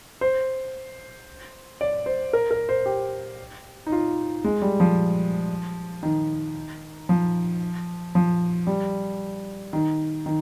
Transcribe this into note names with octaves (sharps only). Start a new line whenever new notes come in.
C5
D5
C5
A#4
A#4
C5
G4
D#4
F4
G#3
G3
F3
D#3
F3
F3
G3
D#3
D#3